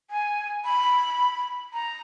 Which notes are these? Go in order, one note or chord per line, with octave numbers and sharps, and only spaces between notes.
G#5
B5
A#5